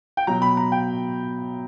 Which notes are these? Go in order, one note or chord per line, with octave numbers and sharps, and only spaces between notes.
G5
B2 F#3 A#5
B5
A#5
G5